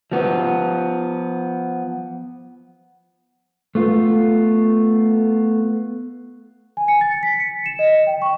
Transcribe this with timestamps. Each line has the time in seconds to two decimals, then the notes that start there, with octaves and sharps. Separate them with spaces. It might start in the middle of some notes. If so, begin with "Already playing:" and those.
0.11 F3 B3
3.75 A3 B3 F4
6.77 G#5
6.88 C#7
7.01 A6
7.23 B6
7.40 C#7
7.66 E7
7.79 D#5
8.07 G5
8.22 C#6